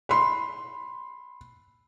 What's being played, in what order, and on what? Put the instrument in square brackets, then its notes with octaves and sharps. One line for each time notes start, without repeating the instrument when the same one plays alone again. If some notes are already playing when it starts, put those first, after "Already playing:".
[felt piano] B5 C6